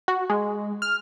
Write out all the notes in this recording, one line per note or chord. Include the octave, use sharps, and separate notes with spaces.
F#4
G#3
F6